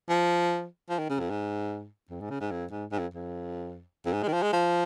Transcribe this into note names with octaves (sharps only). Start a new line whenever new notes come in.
F3
F3
D#3
C#3
F2
G#2
F2
G#2
C#3
G#2
F2
G#2
G#2
F2
F2
F2
G#2
G#3
D#3
F3
G#3
F3